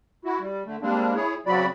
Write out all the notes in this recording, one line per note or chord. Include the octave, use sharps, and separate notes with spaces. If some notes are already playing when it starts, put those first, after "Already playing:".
E4 F#4
G3
D3 A3
G3 G#3 A#3 C4 D4
E4 G#4 C#5
C#3 F#3 C4 F#4 D5 B5